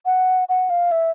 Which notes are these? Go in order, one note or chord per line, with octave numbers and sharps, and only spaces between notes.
F#5
F#5
F5
E5